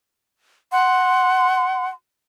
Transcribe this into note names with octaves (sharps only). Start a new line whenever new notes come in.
F#5 C6